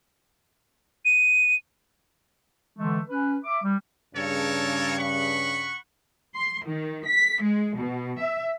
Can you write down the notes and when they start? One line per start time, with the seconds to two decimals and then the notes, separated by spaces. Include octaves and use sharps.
1.05 D#7
2.79 D3 E3 G#3 A3
3.08 C#4 B4
3.44 E5 D6
3.63 G3
4.15 G2 C#3 A4 A#4 C#5
4.97 F#5 B5 C#6
6.36 C6
6.67 D#3
7.07 B6
7.45 G#3
7.80 B2
8.21 E5